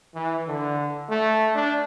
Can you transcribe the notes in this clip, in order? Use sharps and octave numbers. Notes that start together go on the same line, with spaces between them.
E3
D3
A3
D4